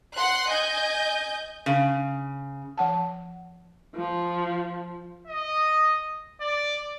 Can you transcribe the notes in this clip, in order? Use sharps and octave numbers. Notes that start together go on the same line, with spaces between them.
F#5 C6 F#6
D#5 G#5 G6
C#3
F3 F#5 A5
F3
D#5
D5